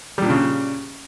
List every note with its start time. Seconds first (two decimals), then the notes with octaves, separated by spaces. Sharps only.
0.18 G3
0.22 A#2
0.26 D4
0.30 C#3